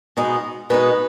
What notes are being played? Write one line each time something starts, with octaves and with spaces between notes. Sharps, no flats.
B2 G#3 B3 D#4
B2 G#3 B3 D#4 B4